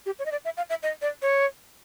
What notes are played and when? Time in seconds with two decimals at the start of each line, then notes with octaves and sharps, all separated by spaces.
0.06 G4
0.19 C#5
0.26 D#5
0.32 D5
0.45 E5
0.57 F5
0.70 E5
0.83 D#5
1.02 D5
1.22 C#5